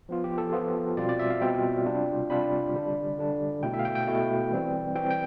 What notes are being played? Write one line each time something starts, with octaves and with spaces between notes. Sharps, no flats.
F3 B3 F4
G4
A4
F3 B3 F4
B2 G3 C4 F4 D5
D5
E5
F5
B2 G3 C4 F4 G5
C3 G3 D4 F4
C3 G3 D4 F4 B5
D3 G3 D4
D3 G3 D4
B2 A3 E4 G5
E5
F5
G5
G5
B2 A3 E4
E3 G3 C4
E3 G3 C4 G5
G5